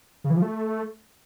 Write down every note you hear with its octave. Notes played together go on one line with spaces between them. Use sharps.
C#3
E3
F3
A3